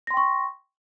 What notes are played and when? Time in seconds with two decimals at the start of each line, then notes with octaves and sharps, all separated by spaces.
0.07 A#6
0.11 C6
0.14 G5
0.17 C#6